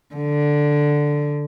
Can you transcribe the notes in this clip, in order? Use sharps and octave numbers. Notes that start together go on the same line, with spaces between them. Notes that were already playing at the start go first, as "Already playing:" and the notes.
D3